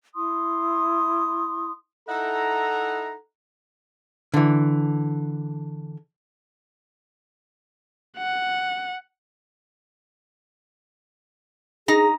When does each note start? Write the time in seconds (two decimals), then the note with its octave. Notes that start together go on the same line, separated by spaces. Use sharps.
0.15 E4 C6 D#6
2.09 D#4 E4 A4 F#5 A#5
4.34 D3 E3
8.18 F#5
11.88 D#4 G#4 A#5